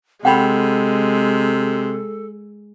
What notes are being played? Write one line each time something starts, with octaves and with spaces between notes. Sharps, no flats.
C3 G#3 A4 F#5 G5 B5